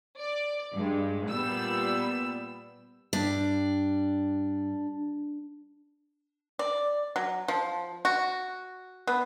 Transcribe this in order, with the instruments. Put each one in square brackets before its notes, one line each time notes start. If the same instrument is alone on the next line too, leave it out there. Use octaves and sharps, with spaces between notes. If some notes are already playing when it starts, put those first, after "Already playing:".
[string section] D5
G2 G#3
A#2 G3 B3 E6
[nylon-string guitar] G2 [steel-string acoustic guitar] D4
[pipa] D5
F#3
F3
F#4
B3